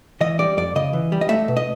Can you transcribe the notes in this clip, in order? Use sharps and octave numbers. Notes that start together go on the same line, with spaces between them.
E3 D#5
G3 D5
F2 D5
C#3 D#5
E3
G3
D#5
A3 E5
B2
D#5